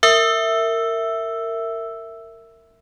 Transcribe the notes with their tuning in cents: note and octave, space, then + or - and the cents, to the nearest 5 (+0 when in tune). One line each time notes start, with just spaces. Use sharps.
A#4 -25 E5 +0 E6 +5